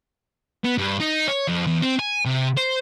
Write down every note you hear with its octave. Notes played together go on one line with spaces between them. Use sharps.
B3
G2
D#4
C#5
F2
E2
C4
G#5
C3
C5